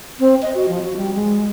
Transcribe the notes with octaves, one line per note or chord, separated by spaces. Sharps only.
C4
D#5
F#4
F3
F#4
G3
G#3